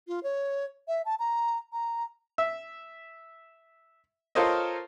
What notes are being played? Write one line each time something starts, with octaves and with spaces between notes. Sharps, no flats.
F4
C#5
E5
A5
A#5
A#5
E5
F4 A4 A#4 C5 C#5 D#5